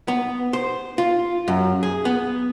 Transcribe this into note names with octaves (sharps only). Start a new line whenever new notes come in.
B3
C5
F4
F#2
G#4
B3